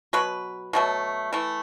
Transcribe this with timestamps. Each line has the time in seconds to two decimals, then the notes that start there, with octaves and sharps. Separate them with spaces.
0.13 B2 F#3 B4
0.73 B2 F#3 A3
1.32 E3 A3